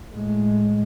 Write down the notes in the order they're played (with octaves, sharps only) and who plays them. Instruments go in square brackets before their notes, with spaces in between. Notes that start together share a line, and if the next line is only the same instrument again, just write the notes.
[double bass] A2 G#3